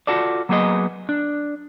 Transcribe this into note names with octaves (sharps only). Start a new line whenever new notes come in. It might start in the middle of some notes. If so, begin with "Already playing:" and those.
F4 F#4 A4 D5
F#3 A#3 B3 G#4 D#5
D4